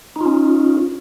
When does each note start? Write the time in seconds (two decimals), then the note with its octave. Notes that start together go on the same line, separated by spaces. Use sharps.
0.16 D#4
0.21 F4
0.26 C#4